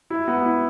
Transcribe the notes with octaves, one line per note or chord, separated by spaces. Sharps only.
E4
B3
E4